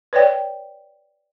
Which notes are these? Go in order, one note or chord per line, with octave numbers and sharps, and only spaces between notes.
B4 C#5 D5 G5